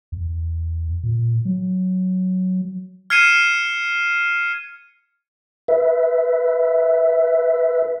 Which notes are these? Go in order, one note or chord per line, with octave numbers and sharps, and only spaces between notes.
E2
A#2
F#3
F6 G#6 C7 C#7 D#7 E7
B4 E5